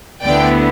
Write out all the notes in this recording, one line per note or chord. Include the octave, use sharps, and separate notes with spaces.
D2 D3 B3 E4 D5 G5